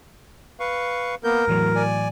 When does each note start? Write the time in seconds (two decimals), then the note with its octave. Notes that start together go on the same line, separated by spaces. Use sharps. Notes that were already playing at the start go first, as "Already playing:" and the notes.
0.60 B4 F5 C#6
1.24 A#3 B3 A#4 G6
1.48 E2 A2 E3 F#3
1.75 D5 G#5